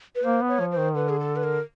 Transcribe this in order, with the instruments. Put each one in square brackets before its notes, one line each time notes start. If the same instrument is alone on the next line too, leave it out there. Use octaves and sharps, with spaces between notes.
[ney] B4
[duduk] A#3 [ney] C5
[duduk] B3
[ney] C#5
[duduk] F3
[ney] C5
[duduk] D#3
[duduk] D3 [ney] B4
[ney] G#4
A4
B4
A#4